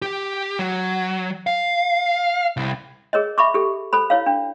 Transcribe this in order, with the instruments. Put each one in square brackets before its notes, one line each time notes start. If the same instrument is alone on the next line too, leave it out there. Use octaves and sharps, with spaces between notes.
[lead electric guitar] G4
F#3
F5
C2
[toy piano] G#4 A#4 C#5 D#5
E5 B5 C#6 D6
G4 A4
A4 C5 B5
E4 C#5 F5
D4